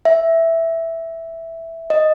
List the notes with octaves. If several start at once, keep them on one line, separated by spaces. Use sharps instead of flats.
E5
D#5